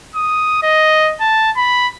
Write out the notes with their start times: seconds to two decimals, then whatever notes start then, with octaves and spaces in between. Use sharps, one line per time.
0.15 D#6
0.63 D#5
1.21 A5
1.56 B5